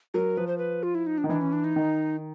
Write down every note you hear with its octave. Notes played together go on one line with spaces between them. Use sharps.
F#3 A#4
F3 B4
C5
B4
F4
E4
D#4
D4
D#3
E3 D4
C#4
D4
D#4
D#3